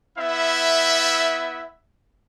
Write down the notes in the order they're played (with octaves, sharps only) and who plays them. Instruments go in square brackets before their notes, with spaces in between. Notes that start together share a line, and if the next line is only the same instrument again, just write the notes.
[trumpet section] B3 E4 E5